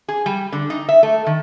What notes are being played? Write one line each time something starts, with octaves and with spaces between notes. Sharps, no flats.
G#4
G3
D3
D#4
E5
A3
D#3